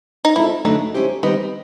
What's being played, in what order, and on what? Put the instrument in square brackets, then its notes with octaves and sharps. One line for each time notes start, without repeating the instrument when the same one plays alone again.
[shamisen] D#4
[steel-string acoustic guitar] G#3 C4 F4 A4 [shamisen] E4
[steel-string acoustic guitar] F#2 D3 F#3 A3 D4 [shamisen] D#4
[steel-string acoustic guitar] G#3 C#4 E4 G4 C5
[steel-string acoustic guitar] D#3 G3 C4 D#4 [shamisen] B3